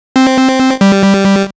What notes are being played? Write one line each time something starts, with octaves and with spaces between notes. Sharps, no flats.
C4
G3